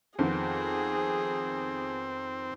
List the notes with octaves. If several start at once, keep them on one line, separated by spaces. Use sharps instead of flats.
F2 D#3 B3 C4 G#4